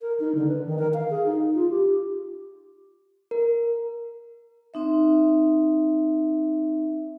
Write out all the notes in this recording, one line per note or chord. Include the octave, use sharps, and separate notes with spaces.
A#4
D#4
D3
B4
D#3
A#4
F5
G#4
D#4
F4
G4
A#4
C4 D#4 E5